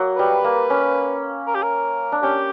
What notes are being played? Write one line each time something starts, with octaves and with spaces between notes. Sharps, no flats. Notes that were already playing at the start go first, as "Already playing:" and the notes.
Already playing: F#3 A#3
G3 B4
A#3
C#4
A#4
G4
A#4
D4
C#4 G4